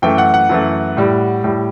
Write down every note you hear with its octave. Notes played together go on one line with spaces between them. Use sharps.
F#2 E3 A3 G5
F#5
F#5
F#2 E3 A3
A2 G3
A2 G3